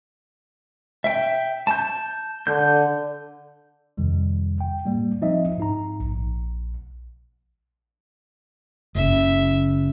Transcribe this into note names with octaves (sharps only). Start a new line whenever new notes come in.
E5 G5
A5 G6
D3 G6
F2 C3 D#3 G3
G5
A2 G3 A#3
F3 C4 D#4 D#5 E5
G#2 D#4 A#5
A#1
F#1 C#3 E5